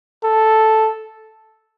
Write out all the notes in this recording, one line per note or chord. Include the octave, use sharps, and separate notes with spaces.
A4